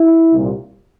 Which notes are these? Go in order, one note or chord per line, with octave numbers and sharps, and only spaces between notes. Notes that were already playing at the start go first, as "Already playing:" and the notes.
Already playing: E4
C2 A#2